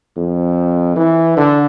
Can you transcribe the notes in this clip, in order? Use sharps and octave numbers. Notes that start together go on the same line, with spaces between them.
F2
E3
D3